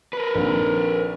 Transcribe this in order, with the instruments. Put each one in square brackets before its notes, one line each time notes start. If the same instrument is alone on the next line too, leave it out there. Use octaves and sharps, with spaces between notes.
[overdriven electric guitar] A#4 B4
[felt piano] A#1 D#3 C4